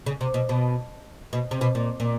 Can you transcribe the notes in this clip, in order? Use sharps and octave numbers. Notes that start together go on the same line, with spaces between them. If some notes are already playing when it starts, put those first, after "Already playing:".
C#3
C3
B2
B2
B2
C3
B2
A#2
A#2